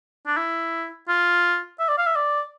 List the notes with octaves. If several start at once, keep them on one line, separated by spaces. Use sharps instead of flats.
D4
E4
F4
E5
D5
F5
E5
D5